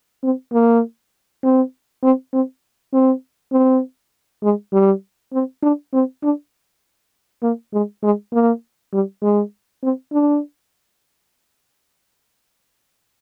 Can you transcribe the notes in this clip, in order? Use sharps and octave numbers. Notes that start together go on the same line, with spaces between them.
C4
A#3
C4
C4
C4
C4
C4
G#3
G3
C4
D4
C4
D4
A#3
G#3
G#3
A#3
G3
G#3
C4
D4